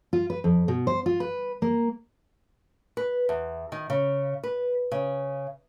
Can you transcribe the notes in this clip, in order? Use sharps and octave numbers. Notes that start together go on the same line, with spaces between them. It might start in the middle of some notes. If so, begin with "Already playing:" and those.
F4
B4
F2
B2
C5
F4
B4
A#3
B4
E2
D#3
C#3
B4
C#3